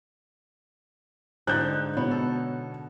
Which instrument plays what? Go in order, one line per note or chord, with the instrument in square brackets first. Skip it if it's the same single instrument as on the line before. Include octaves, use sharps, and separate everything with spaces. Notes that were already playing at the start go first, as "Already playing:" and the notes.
[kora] G#2 D3 D#4 [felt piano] F#6 G6
[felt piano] B2 C#5 [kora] B3
[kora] A4